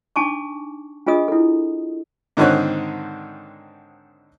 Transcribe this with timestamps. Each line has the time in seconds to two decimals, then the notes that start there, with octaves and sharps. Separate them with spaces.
0.16 D4 D#4 G#5 A5 C#6 D6
1.07 D4 F4 G#4 D#5 D#6
1.28 E4 A4
2.37 G#2 D3 D#3 C4 C#5 F#6